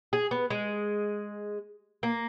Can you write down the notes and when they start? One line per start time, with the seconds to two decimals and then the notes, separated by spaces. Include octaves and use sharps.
0.13 G#4
0.31 B3
0.50 G#3
2.03 A#3